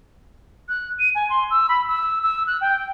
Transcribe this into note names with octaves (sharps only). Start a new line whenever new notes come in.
F#6
D#7
G#5
C6
E6
B5
E6
E6
F#6
G5